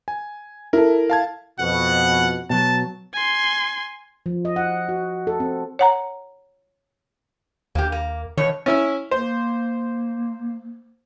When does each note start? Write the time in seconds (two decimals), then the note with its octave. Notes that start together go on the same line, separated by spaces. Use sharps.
0.08 G#5
0.73 E4 A4 A#4
1.10 F5 A5 G#6
1.60 F2 B2 F#5
2.50 B2 F#3 A5
3.13 G#5 C6
4.26 F3
4.45 D#5
4.56 F#5
4.89 F#4
5.27 A4
5.40 C4
5.79 C#5 F#5 A#5
7.75 D#2 A#3 G4
7.92 A#3
8.37 E2 B2 D#3 C#5
8.66 C#4 E4 E6
9.11 A#3 C5